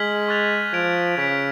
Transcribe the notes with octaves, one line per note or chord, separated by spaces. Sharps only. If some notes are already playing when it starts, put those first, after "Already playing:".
Already playing: G#3 F6 G#6 B6 F#7
C#6 F#6 A6 F7
F3 G#6 D7 F7
C#3 G#6 B6 D7